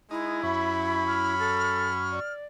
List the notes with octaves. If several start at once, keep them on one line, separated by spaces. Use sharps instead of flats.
G#3 D#4 E4
F#2 C#4 E5 B5
F6
A4
D5